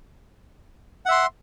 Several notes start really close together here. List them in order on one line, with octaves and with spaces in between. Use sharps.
F#5 E5 C6